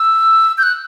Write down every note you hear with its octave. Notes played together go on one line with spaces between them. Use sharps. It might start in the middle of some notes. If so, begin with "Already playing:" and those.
Already playing: E6
G6
F#6